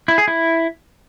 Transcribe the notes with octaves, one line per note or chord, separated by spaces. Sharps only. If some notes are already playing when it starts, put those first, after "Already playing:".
E4
G#4
E4